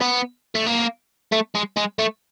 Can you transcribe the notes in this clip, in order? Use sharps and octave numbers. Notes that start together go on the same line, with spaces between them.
B3
A3
A#3
A3
G#3
G#3
A3